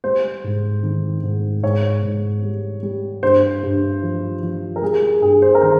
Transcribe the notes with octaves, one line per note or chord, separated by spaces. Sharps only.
G3 C5
G#2
D#3
G#2
G#2 C#5
G#2
G3
G3
G2 C5
G2
F3
F3
A#4
G3 G#4
G#4
G2 G#4
C5
A#4
D#3 C5